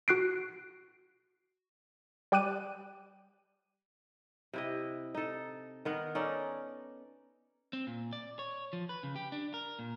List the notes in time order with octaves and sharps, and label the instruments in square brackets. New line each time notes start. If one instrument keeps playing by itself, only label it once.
[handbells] F#4 F#6 C7 D7
[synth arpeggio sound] G3 G5 D6 F#6 D#7
[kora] C3 E4 D#5
D#4 A4
D#3 B3 A#4
C#4 D#4 A4 D5
[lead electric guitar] C4
A#2
D5
C#5
F3
B4
C#3
G4
D4
A#4
A#2